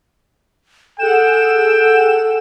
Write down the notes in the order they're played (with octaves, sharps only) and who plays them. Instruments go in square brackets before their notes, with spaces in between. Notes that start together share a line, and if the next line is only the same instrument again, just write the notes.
[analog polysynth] G#4 F#5 E7 [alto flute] A4 [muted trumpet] G5